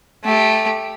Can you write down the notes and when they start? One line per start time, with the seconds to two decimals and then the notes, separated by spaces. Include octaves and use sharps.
0.25 A3 G4